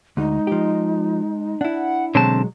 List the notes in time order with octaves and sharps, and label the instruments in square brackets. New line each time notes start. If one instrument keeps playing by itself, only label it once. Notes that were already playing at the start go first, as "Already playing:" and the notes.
[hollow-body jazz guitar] D2 [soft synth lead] G#3 [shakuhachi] D#4
[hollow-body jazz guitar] F3 G4
[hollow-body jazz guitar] D4 E4 [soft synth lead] F#5
[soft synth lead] B2 [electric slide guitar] D3 C4 A5 [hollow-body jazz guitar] F#3 G#3 C#5